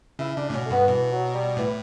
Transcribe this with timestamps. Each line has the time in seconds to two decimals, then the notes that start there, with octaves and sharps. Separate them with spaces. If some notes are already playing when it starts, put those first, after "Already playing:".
0.19 C#3 E4
0.37 C#3 D4
0.48 A2 D4
0.54 B2 C#4
0.66 A3
0.71 G2 B3
0.88 B2 E3
1.11 F#3
1.34 G3
1.57 A2 E3